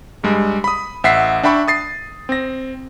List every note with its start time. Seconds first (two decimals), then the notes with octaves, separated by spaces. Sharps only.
0.24 G2 G3 G#3
0.64 B5 D#6
1.04 A1 E5 F#5 B6 C7
1.43 D4 E5 G5 B5 C#6
1.68 D#6 A6 C7
2.29 C4 A#6